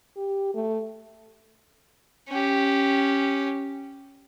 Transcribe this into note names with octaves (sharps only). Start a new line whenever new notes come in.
G4
A3
C#4 G4